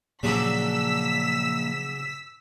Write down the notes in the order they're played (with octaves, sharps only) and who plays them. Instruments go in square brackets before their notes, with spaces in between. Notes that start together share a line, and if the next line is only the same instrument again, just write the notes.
[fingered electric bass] A#2 F3 [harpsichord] C#3 F#3 D4 [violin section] E6 B6